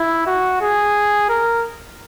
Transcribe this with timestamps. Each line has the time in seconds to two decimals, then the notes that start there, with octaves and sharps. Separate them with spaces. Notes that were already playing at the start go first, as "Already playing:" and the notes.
Already playing: E4
0.27 F#4
0.61 G#4
1.29 A#4